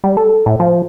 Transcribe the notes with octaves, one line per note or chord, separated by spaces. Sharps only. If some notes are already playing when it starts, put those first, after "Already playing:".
G3
A4
A2
F3